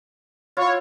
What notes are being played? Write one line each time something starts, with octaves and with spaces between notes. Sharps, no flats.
E4 F4 C#5